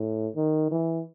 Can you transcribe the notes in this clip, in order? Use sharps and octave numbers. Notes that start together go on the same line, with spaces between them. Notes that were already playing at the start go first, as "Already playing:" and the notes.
Already playing: A2
D#3
E3